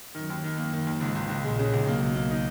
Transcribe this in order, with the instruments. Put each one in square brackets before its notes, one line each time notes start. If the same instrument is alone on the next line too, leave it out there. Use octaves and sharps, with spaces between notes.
[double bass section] F#2 [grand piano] D#3
[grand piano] D#2
D#3
[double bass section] F#2 [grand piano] A#3
[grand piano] D#3
D#2
[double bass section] G#1 G#2 [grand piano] C#2
[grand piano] C#2
C#2
[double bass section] A#1 A#2 [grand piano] G#3
[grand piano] C#3
C#2
[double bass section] B1 B2 [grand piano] A#3
[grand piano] C#2
A#3
D#4